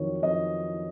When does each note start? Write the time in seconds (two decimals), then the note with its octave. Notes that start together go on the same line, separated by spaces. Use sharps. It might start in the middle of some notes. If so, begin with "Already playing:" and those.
Already playing: F2 D#3 F#3 C#5
0.22 F2 D#5